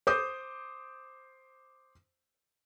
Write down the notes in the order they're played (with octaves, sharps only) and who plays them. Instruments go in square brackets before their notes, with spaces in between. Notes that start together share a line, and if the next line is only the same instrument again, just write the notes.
[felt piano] C5 D6 D#6 G6